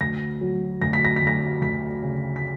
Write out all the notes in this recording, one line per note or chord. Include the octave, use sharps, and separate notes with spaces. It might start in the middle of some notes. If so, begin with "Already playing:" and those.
D2 A#6
F#3
D2 A#6
B6
A#6
B6
D2 A#6
D2 B6
C#3
B6